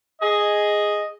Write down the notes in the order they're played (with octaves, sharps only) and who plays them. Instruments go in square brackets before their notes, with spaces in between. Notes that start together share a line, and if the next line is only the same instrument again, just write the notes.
[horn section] G#4 D#5